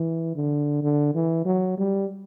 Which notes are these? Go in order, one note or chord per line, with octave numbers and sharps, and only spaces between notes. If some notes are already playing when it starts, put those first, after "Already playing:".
Already playing: E3
D3
D3
E3
F#3
G3